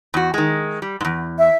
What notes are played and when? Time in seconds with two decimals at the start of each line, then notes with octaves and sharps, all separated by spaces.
0.14 E2 F#4
0.34 D#3 G#3
0.82 G3
1.01 E2 G#2
1.38 E5